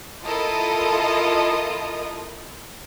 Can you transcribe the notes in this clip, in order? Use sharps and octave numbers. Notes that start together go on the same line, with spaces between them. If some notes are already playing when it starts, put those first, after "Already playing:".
E4 F4 A4 A#4 D#5 D#6